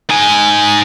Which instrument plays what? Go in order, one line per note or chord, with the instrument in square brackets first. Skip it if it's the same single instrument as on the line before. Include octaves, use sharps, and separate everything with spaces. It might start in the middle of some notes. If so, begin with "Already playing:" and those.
[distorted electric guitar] D#4 G#5